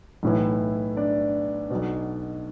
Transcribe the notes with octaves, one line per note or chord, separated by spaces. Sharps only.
B1 A2 E3
D4 D5
B1 B2